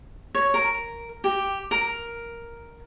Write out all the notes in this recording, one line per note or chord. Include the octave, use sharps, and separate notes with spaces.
C#5
A#4
G4
A#4